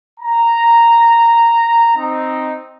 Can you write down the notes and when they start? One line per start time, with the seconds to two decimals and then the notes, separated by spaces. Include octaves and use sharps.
0.20 A#5
1.97 C4 D#4